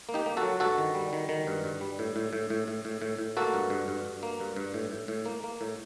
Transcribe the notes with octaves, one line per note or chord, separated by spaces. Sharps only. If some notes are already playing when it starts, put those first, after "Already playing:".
A#3
D#4 G4
A#3
F#4 A4
F#3
G2 F#4 A4
D#3
G3
D#3
D#3
G2
G2
G3
A2
A2
A2
A2
A2
A2
A2
A2
A#3 F#4 A4
G2
G2
G2
G2
A#3
G2
G2
A2
A2
A2
A#3
A#3
A2